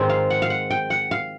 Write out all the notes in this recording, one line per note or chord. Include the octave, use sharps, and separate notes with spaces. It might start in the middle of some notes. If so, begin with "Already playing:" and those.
Already playing: G#2 D#3 G#3 C4
F5
F#5
F5
F#5
G5
F#5
F5